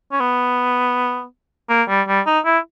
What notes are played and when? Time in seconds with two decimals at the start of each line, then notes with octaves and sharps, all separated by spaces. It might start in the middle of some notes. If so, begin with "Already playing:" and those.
0.12 C#4
0.20 B3
1.70 A#3
1.89 G3
2.08 G3
2.26 D#4
2.45 E4